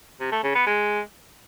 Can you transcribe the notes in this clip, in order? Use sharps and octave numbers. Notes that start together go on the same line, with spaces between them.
C3
A3
C#3
B3
G#3